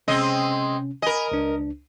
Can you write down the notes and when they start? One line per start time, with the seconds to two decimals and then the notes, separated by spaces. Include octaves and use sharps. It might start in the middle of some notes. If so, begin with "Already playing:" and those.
0.08 C3 G#3 C4 C#4 D#5
1.02 A#4 D#5 G#5 B5
1.32 C#2 D4